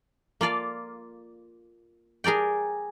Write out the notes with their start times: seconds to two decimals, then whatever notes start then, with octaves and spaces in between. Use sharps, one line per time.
0.41 A#3 F4 D5 F5
2.24 G#4 A#4 D5 G5